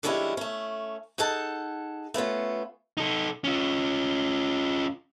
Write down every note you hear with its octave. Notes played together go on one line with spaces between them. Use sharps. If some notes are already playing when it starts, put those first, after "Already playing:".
D3 F3 G3 G#3 C#4 E4
A3 C#4
D#4 G#4 A4 F#5 A5
A3 B3 C#4 F4
D#4 A4
C#4 F4